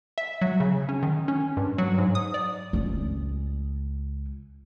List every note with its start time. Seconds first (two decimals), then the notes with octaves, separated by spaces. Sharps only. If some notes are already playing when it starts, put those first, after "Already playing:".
0.18 E5
0.41 F#3
0.60 C#3
0.89 C#4
1.03 D#3
1.28 C#4
1.57 G2
1.78 F#3
1.98 G#2
2.15 D#6
2.34 D5
2.73 C#2 C#4